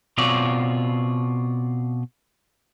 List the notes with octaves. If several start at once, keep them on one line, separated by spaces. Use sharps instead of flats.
B2 C4 F4 C#5 D5